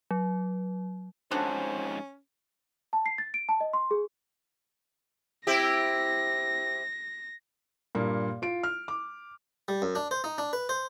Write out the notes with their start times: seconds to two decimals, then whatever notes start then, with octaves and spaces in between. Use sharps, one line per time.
0.11 F#3
1.31 F2 G#2 C#4 D4 F#4 A4 C5
2.93 A5
3.06 C7
3.18 A6
3.34 D7
3.49 A5
3.60 D#5
3.73 C6
3.91 G#4
5.47 C4 E4 G4 A#6
7.95 G2 A#2 A#3
8.42 F4 D7
8.63 F6
8.88 D6
9.68 G3
9.82 F#2
9.95 D4
10.11 C5
10.24 D#4
10.38 D4
10.53 B4
10.69 C5